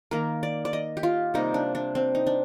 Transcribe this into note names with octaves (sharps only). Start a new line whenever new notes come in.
D#3 A#3 A#4
D5
D5
D#5
G4
F4
C3 G3 A#3 D#4
D4
D4
C4
D#4
D4